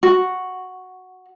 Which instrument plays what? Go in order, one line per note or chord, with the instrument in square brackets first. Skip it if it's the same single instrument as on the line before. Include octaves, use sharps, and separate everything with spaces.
[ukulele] F#4